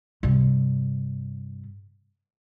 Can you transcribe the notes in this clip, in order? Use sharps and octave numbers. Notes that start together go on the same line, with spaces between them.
G2 C3